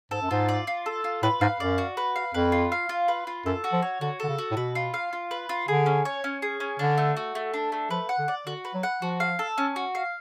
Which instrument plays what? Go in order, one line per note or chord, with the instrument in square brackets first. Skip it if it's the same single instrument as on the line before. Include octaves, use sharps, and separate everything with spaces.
[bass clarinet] G#2 [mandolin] A4
[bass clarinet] F#2
[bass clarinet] G#2 [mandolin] F4
[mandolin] D5
F4
A4
F4
[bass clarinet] A2 [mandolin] B4
[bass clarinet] G#2 [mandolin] F5
[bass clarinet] F#2 [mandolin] D5
[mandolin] F#4
B4
F5
[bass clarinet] F2 [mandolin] B4
[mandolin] F4
F5
F4
B4
F4
[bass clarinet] F#2 [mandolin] A4
[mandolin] F#4
[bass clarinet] F3
[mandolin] C#5
[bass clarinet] D3 [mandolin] F#4
[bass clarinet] D3 [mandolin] A4
[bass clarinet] C#3
[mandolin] F#4
[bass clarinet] A2
[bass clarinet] B2 [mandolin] B4
[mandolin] F4
F5
F4
B4
F4
[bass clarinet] D3 [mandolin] G#4
[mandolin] C#4
C#5
C#4
G#4
C#4
[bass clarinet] D3 [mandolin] D4
[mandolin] A3
F#4
A3
D4
A3
[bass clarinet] F3 [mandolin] B4
[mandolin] F#5
[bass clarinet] D3
[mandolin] D5
[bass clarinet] D3 [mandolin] F#4
[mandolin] B4
[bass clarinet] F#3
[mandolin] F#5
[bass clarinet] F3 [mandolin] F#4
[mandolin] F5
A4
C#4
F#4
F5